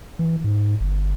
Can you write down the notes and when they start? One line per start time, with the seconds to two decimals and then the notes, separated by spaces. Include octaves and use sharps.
0.19 E3
0.44 G#2
0.80 G1